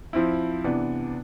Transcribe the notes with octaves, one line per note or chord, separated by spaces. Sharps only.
F3 C4 E4
C3 E3 B3 D4